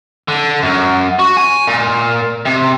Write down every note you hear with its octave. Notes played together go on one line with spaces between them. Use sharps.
D3
F#2
F#4
G#5
A#2
C3